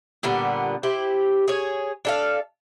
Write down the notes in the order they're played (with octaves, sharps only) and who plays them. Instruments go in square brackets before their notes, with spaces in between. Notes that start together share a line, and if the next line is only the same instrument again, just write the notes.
[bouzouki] A#2 D3 G3 B3
E4 G4 C5
G#4 C#5
D4 A4 F5